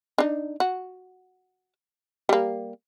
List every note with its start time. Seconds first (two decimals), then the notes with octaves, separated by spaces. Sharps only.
0.18 D4 D#4
0.60 F#4
2.29 G3 A#3